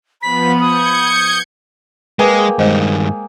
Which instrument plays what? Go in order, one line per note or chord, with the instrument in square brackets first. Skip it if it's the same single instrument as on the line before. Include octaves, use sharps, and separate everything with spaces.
[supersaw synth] F3 B3 [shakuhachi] B5 [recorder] B6
[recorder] D#6 [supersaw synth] G6 G#6 C#7
[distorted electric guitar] G#3 [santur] A#3 G#4 G5 [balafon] B4
[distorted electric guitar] G2 D#3 [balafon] G#3 C5 D#5